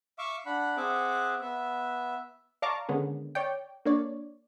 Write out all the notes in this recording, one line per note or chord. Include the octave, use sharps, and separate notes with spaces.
E5 F5 C#6 D6 E6
D4 F#5 B5
C4 G#4 E5 F#5 D6
B3 E5
D5 F5 A5 A#5 C#6 D6
D3 D#3 G#3 B3 C#4
C#5 D5 G5
A#3 D4 C#5 D5